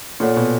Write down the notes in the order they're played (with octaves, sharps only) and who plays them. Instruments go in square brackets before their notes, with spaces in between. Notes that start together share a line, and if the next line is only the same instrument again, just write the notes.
[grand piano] A#2 [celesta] F4 A4 C#5 F#5
[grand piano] B2